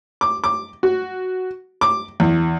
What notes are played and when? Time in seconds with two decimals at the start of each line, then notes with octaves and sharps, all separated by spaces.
0.21 D6
0.44 D6
0.83 F#4
1.81 D6
2.20 E2